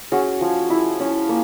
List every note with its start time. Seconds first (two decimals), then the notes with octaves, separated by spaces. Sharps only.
0.12 C#4 F#4 G#4
0.41 F3
0.70 E4
1.00 C#4
1.29 A#3